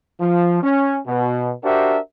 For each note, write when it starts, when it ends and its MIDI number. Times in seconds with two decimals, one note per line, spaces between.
0.19 0.61 53
0.62 0.98 61
1.07 1.51 47
1.63 1.97 62
1.63 1.97 66
1.63 1.97 67
1.63 1.97 70
1.63 1.97 72
1.63 1.97 76